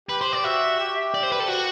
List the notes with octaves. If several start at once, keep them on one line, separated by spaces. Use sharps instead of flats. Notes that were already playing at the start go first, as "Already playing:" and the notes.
G4 B4
C5
D5
F#4 E5
G4
D5
C5
B4
A4
F#4